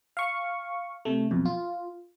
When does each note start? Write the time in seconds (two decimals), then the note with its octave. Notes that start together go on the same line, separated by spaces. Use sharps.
0.17 F5 C#6
1.05 C3 A3
1.31 B1 F2 B2
1.45 F4